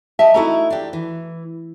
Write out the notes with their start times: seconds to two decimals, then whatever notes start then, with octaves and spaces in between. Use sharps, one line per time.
0.19 G4 D#5 E5 A5
0.34 A3 D#4 E4 F#4 A4 A#5
0.70 D4 G4
0.93 E3